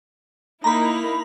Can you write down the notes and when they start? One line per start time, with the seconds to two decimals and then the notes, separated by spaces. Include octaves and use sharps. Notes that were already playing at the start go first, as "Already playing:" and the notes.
0.64 A#3 D#4 E4 A#5 B5